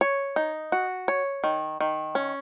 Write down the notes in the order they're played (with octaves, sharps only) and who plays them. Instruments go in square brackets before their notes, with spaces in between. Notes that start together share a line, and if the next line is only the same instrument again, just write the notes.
[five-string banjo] C#5
D#4
F#4
C#5
D#3
D#3
C#4